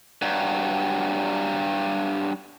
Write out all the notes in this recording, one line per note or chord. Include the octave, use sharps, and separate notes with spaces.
G2 F#3